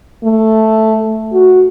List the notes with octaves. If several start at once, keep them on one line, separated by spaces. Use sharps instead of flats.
A3
F#4